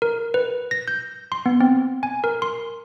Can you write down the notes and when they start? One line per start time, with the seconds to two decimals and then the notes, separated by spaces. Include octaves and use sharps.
0.02 A#4
0.34 B4
0.71 A#6
0.88 G6
1.32 C6
1.46 B3
1.61 C4
2.03 G#5
2.24 A#4
2.42 C6